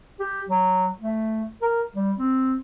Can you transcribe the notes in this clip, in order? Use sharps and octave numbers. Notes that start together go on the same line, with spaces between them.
G4
F#3
A3
A#4
G3
C4